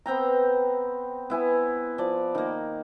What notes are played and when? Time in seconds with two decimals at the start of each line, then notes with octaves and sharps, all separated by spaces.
0.06 B3 C4 G5 A#5
1.30 B3 E4 G#5
1.98 F3 D5
2.35 D#3 A#3